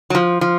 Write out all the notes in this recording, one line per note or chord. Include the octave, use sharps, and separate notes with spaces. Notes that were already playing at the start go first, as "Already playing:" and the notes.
F#3
F3
F3